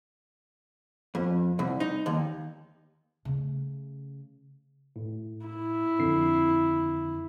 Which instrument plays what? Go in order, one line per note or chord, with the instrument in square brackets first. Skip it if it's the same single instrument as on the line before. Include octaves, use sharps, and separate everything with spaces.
[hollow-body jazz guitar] F2
C2
D#4
D#2
[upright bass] C#3 A3
[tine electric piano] A2
[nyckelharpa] E4
[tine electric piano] F2 D3 C7